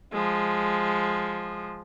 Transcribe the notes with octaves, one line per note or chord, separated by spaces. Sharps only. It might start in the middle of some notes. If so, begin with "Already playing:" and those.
F3 G#3